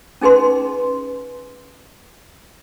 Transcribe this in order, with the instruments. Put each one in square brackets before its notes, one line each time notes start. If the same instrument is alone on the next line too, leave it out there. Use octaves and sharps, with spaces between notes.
[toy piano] C#4 D#4 G#4 B4 C6